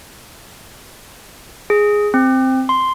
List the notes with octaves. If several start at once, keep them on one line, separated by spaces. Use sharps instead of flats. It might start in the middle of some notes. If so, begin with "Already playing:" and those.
G#4
C4
C6